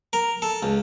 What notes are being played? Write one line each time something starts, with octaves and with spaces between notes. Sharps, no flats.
A#4
A4
C#2